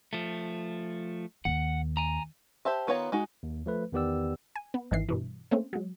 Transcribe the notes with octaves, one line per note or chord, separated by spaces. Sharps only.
F3 A3
D#2 F#5
G#5 A#5
G4 C5 E5 A5
D#3 B3 F4 C#5 A#5
G#3 D#4 F#4
D#2
F3 A3 B4
E2 D#3 B3 G4 D5 E6
G#5
B3
G#1 D#3 E3 C7
G2 B2 E3
A3 A#3 C4 C#4
F#3 G#3